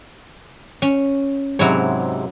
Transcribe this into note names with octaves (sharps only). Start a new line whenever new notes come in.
C#4
G#2 C3 F#3 E4 C#5